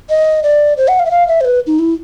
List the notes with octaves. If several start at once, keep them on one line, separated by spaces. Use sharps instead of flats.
D#5
D5
C5
F#5
F5
E5
F5
E5
C5
B4
D#4
E4